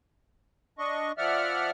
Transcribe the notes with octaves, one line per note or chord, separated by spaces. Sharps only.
D4 D#5 C#6
F3 D5 E5 F#5 F6